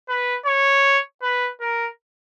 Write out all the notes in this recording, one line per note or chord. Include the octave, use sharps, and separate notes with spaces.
B4
C#5
B4
A#4